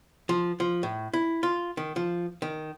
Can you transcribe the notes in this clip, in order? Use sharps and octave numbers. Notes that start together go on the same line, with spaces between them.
F3
F3
A2
E4
F4
D#3
F3
D#3